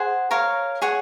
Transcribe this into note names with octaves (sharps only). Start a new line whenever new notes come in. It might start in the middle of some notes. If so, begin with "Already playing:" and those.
Already playing: G#4 C5 F#5
A#4 C#5 F5
G#4 C#5 F#5